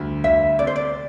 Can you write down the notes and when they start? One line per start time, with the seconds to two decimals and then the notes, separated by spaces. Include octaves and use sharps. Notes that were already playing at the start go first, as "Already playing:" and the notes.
Already playing: D2 D3 G3
0.24 D2 E5
0.59 C3 D5
0.67 C5
0.76 D5